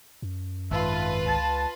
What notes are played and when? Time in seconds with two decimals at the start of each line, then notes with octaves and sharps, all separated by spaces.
0.22 F#2
0.71 G#1 F4 B4 E5 A5
1.26 C#2 A5